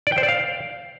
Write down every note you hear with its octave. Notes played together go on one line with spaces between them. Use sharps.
D5
G5
C5
D5
F5